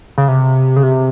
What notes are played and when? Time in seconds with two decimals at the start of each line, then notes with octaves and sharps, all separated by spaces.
0.18 C#3
0.28 C3
0.76 C#3
0.83 C3